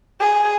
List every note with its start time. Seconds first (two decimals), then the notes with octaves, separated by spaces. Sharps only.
0.20 G#4